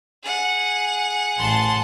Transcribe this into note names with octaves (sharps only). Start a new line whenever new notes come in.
G#4 F#5
A1 A5 C6